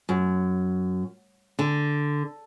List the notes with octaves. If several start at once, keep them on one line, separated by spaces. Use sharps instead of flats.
F#2
D3